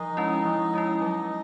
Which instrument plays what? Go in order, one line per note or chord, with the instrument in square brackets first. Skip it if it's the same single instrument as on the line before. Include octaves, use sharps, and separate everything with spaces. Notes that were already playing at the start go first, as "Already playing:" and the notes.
Already playing: [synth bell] F3 [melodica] D#4 D#5
[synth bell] G#3 C#4 E4
F3
G#3 C#4 E4
F#3